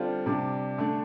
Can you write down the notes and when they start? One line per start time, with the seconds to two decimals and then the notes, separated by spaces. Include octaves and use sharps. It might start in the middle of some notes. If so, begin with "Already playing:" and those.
Already playing: D3 G3 C4 F4
0.26 C3 G3 D4
0.78 D3 A3 D4